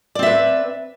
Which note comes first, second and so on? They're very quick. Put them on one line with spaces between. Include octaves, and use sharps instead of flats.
D5 C4 E5 B4